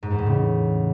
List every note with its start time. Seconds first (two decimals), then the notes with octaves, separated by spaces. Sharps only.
0.03 G#2
0.11 E2
0.19 A2
0.26 C#3